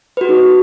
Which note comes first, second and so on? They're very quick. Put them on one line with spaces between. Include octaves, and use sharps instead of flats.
B4 F#4 G#4 D#4